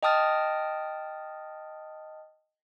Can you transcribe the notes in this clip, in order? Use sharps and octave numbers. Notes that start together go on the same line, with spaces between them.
D#5 G5 A5 D#6 F6 A6